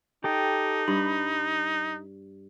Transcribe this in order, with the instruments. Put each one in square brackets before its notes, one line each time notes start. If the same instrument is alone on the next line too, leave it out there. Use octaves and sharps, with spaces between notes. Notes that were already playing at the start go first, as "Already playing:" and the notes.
[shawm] D#4 [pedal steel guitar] G4 A4 G5
[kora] G2 [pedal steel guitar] B5